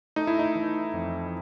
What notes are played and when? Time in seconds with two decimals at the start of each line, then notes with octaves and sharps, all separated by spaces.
0.16 A3 D#4
0.27 E4
0.39 D#4
0.55 E3
0.94 F2